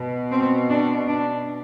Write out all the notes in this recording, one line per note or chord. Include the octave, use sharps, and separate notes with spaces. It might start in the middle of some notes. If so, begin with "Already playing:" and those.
Already playing: B2
C4
D4
D4